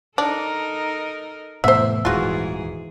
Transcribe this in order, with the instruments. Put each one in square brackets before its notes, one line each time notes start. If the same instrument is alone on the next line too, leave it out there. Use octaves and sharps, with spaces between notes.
[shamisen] D4 [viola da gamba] D#4 A4 A#4
[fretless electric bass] F1 A2 B3 [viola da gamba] E3 [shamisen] C5 F#5 [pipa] E5
[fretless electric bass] D#1 [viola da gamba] G#2 E3 G#4 [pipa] F4 F#4